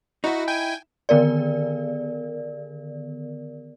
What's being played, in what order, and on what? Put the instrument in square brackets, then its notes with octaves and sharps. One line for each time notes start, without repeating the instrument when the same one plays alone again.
[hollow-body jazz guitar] D#4 E4 [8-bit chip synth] F#4
[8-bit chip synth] G5 G#5
[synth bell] D3 D#3 B3 A#4 D5